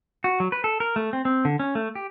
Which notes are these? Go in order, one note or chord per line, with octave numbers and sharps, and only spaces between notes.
F#4
F#3
B4
A4
A#4
A3
C4
C4
D3
C#4
A3
G4